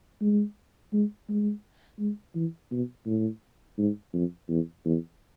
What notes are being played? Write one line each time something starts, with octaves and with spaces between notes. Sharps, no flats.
G#3
G#3
G#3
G#3
E3
B2
A2
G#2
F2
E2
E2